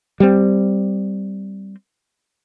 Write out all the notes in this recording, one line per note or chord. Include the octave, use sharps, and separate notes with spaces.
G3 C4